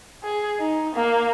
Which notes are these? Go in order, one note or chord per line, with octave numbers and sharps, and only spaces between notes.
G#4
D#4
A#3